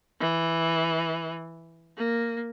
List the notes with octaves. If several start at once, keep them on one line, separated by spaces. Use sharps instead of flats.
E3
A#3